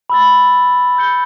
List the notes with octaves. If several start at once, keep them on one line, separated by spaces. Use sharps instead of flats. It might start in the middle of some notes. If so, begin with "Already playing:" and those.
B5 E6 A6
E6 G6 C#7 G7